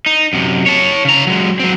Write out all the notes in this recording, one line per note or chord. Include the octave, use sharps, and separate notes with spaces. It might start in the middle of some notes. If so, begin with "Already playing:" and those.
D#4
F#2 C3
C#5 A5
C#3 A#5
F#3 G#3
F#3 C4